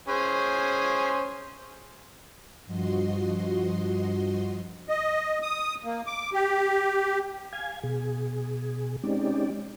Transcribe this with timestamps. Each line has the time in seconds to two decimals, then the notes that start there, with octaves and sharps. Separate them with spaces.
0.08 C#4 G#4 C5
2.66 G2 F3 F#4 D#5 C6
4.89 D#5
5.42 D#6
5.85 A#3
6.06 D6
6.33 G4
7.53 F5 G#5 G#6
7.83 B2 G#4
9.04 G#3 C4 C#4 D#4 G4 D5